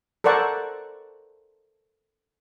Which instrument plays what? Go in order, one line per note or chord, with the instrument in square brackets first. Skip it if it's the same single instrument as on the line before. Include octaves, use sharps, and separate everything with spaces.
[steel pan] A4 A#4 C5 D5 F#5 C#6